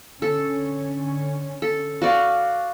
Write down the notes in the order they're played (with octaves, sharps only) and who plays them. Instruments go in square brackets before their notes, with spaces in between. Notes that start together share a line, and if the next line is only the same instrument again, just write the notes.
[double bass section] D3 C#4 [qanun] A4
[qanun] A4
F#4 D5 F5